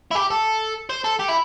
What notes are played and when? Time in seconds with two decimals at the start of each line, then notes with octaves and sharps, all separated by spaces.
0.11 E4
0.15 G4
0.31 A4
0.90 C5
1.05 A4
1.20 G4
1.29 E4